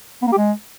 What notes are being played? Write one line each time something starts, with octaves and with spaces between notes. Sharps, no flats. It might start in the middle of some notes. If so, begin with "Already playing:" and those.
B3
A#3
G4
G#3